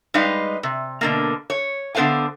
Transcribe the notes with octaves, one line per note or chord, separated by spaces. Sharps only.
G3 G#3 D#4 B4 F5
C3
B2 D3 A#3
C#5
D3 B3 B4 C5 F5 G#5